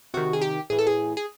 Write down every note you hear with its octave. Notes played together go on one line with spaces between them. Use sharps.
C3 D#3 F#4
G#4
G4
A2 E3 G#4
A4
G#4
G#4